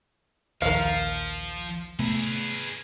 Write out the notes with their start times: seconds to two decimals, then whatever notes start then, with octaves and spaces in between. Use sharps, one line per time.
0.62 A#1 D#2 F3 A#4 F5
1.99 C3 A3 B3 G#4 B4